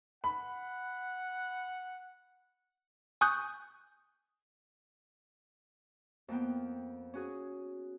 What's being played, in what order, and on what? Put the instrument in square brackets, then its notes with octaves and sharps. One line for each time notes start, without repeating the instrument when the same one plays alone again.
[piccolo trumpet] F#5 [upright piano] B5
[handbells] G#5 C#6 D#6 F#6 G6
[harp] F2 A#3 B3 G5
C#4 F#4 G#4